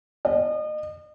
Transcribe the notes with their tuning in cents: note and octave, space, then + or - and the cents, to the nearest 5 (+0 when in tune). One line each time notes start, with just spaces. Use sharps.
D#5 -35